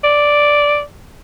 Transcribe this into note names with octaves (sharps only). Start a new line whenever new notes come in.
D5